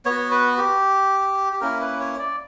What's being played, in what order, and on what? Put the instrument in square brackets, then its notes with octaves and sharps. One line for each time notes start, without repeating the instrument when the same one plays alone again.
[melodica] B3 F#4 C#5
B4
G4
G4
A#3 C#4 E4 A#4
B4
C#5
D5